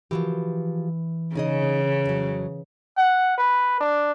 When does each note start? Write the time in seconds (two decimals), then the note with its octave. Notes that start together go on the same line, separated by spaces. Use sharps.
0.11 E3 F3 F#4 G4
1.35 C#3 D#4 G#4 D#5
2.05 F2 F#3
2.97 F#5
3.38 B4
3.80 D4